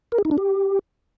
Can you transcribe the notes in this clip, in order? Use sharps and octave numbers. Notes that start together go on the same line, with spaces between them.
A#4
G#4
D#4
D4
G4